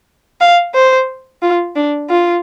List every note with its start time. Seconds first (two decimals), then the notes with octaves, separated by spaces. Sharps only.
0.41 F5
0.74 C5
1.42 F4
1.76 D4
2.10 F4